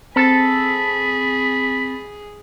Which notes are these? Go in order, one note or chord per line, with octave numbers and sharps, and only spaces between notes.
C4 G#4 A4 B5 A6